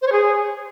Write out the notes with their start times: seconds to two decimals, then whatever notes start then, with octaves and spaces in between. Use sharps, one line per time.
0.01 C5
0.07 C#5
0.12 G#4